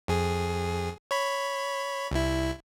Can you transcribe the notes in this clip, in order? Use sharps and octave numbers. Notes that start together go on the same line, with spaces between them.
F2 G#4
C#5 B5
C2 E4